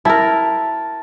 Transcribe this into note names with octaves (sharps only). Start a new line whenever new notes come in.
E4 A#4 A5